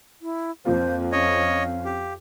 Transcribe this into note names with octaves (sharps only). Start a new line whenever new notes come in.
E4
F2 F3 A#3 C4 F4 C5
C#4 C#5 D#5 F5
G4